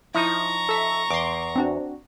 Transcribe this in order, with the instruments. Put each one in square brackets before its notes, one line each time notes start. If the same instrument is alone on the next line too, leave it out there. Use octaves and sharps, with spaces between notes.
[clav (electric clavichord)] F3 D#4 [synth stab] E4 [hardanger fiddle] A#5 C#6
[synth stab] A4 E5
[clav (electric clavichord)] E2 [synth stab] C6 D6
[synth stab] C4 D4 F#4